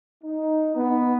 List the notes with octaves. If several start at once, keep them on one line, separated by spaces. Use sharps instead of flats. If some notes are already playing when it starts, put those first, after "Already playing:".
D#4
B3